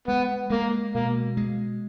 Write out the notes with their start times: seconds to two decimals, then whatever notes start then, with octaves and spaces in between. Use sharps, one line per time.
0.08 G#3 B3
0.50 G#3 A#3
0.94 B2 A#3
1.37 G#3